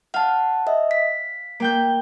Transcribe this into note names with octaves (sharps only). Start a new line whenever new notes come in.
F5 F#5 A5
D#5 E5
B6
A#3 G5 G6